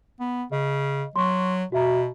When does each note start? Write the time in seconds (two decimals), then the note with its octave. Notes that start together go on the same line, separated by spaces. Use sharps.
0.20 B3
0.52 C#3 D#5
1.16 F#3 C6 C#6
1.72 B2 F#4 E5 A#5